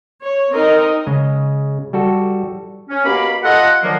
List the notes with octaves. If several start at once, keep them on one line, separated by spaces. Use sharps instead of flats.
C#5
C4 D#4 A#4 D#5
C#3 G#3
G3 F#4 A4
C#4
B2 A#3 G4 F5 B5
F4 A4 D#5 F#5
A#2 D3 D#3 F3 F#3 A#3